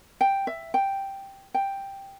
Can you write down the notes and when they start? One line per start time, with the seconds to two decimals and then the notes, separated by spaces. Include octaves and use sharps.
0.21 G5
0.47 E5
0.74 G5
1.54 G5